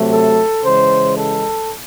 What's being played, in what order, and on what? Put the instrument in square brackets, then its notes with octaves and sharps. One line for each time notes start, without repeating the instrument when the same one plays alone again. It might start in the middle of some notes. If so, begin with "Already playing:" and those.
Already playing: [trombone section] C3 F#3 A3
A4
C#3 E3 G#3 C5
A4